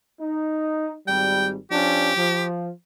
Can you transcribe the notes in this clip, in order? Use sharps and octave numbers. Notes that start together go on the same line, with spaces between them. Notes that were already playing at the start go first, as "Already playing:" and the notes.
D#4
G#1 G3 G5
F3 C#4 D4 G4
F3